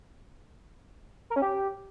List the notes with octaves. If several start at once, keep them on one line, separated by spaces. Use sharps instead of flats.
A#4
C#4
G4